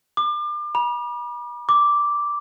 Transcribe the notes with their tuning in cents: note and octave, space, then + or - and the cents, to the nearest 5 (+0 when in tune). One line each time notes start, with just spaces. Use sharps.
D6 +35
B5 -40
D6 -5